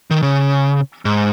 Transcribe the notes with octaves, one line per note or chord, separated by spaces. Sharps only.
D#3
C#3
G#2